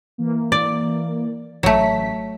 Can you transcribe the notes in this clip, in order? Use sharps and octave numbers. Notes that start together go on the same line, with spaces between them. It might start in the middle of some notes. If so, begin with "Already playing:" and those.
E3 A#3
D5
A1 F#3 A3 B6